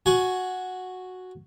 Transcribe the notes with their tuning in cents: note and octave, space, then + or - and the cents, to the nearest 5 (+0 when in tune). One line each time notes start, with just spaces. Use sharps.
F#4 -5 G#5 +15